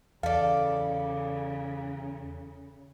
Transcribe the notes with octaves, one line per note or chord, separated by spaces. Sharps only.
E2 C#3 A4 D5 F5